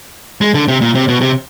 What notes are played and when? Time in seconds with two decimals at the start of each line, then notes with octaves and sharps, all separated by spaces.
0.41 G#3
0.54 D3
0.68 C3
0.81 A#2
0.95 C3
1.08 B2
1.21 C3